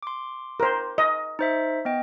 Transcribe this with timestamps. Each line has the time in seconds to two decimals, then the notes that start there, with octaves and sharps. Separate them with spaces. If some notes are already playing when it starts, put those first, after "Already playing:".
0.03 C6 D6
0.60 A#4 C5
0.98 D#5
1.39 D#4 C5 E5
1.85 B3 D#5 G5